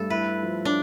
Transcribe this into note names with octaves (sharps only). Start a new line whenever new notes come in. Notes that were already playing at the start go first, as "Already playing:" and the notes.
Already playing: G2 A3 A4
E4 B4
F3
D4